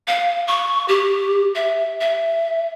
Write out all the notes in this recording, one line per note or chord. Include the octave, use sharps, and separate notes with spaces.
F5
C#6
G4
E5
E5